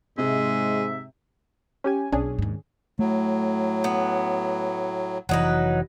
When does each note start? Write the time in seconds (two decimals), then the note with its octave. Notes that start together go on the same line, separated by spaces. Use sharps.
0.18 G#2 C3 G#3 E5
1.84 C#4 G4 G#5
2.12 B1 C#4 D4 G#4
2.39 D#2 G#2
2.99 A2 F#3 A3
3.84 B3
5.29 F1 E3 F#3 D#4 B4